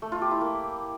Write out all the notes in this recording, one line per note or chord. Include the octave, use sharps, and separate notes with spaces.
A3
F4
G4
E4
A#3